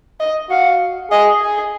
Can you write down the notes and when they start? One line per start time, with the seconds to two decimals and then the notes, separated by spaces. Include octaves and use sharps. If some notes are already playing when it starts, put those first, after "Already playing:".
0.20 D#5
0.50 F#4 F5
1.11 G#4 D#5
1.41 G#4